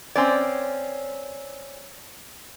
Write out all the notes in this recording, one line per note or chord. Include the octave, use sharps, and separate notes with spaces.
C4 C#4 D5